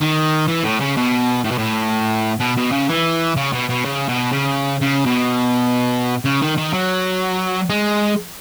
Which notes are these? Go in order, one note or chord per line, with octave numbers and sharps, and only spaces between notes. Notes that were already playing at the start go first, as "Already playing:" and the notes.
D#3
E3
A2
C#3
B2
A2
B2
A2
B2
B2
C#3
E3
C#3
B2
B2
C#3
B2
C#3
C#3
B2
C#3
D#3
D#3
F#3
G#3